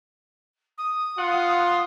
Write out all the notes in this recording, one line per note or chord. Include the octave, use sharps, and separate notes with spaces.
D#6
F4 F#5